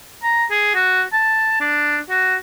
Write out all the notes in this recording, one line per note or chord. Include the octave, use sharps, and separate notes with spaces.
A#5
G#4
F#4
A5
D4
F#4